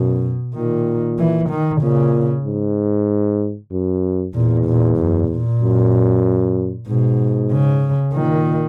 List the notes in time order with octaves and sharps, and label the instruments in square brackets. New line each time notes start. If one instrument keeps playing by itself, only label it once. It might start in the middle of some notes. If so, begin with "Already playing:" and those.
Already playing: [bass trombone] F#2 [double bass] B2
[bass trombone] A#2 [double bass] D#3
[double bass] E3
D#3
[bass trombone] A#2 [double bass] C#3
[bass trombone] G#2
F#2
[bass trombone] E2 [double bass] A#2
[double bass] A#2
F#2
A#2
[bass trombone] F#2
[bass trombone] G#2 [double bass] B2
[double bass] C#3
[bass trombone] A#2 [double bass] D#3